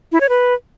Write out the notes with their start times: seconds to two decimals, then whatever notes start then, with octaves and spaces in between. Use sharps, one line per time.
0.12 E4
0.21 C#5
0.29 B4